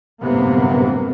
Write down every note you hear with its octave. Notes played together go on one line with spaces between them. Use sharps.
G1 F#2 A2 C3 A#3 B3